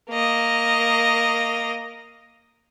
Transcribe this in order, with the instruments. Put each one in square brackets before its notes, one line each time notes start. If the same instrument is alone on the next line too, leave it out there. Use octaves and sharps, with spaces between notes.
[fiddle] A#3 D#5